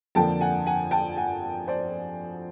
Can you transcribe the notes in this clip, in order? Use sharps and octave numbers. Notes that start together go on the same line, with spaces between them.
F2 D3 F3 A#3 D4 G5 A5
F#5 G#5
F#5 G#5
G5 A5
F#5 G#5
C5 D5